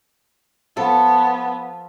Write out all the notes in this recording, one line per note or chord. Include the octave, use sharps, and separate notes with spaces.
F3 B3 A4